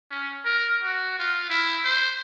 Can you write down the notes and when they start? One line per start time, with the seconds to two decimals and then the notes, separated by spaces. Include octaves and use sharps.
0.11 C#4
0.45 A#4
0.83 F#4
1.19 F4
1.49 E4
1.85 C5